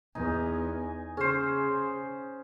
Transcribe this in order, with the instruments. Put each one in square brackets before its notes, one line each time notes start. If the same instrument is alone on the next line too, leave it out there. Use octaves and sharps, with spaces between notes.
[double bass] E2 [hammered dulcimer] D#4 [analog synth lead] G#5
[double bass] C#3 [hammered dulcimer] C#4 C5 [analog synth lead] G#4